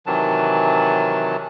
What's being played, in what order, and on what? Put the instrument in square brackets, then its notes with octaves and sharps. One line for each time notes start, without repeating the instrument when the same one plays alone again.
[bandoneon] C3 D#3 E3 F#3 A5